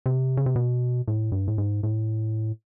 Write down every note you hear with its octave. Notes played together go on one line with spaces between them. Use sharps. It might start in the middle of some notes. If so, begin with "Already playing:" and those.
C3
C#3
C3
B2
A2
G2
A2
G#2
A2